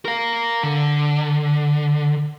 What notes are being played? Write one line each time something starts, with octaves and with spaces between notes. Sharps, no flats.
A#4 F5
D3